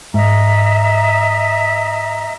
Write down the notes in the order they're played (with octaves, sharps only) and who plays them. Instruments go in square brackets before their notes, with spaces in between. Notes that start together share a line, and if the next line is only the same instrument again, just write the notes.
[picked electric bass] G#2 [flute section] D#5 E5 A#5